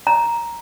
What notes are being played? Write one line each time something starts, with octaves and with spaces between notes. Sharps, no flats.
A#5